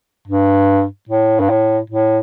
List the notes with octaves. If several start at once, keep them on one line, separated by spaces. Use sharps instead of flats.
G2
A2
G2
A2
A2